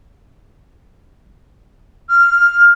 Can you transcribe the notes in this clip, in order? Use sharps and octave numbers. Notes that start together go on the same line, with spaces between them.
F6